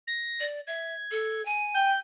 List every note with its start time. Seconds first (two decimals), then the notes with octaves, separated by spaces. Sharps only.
0.07 A#6
0.40 D5
0.67 E5 G#6
1.11 A4
1.45 G#5
1.75 G5 G6